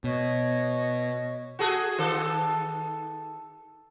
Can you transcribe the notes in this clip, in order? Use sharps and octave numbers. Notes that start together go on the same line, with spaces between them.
B2 C#5 D#5 C#6
F#4 G#4 A4
D#3 A4